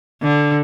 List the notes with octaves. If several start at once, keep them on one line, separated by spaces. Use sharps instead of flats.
D3